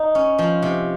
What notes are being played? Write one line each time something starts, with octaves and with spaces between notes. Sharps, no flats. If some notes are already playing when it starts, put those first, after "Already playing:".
Already playing: D#4
C#4
F3
C3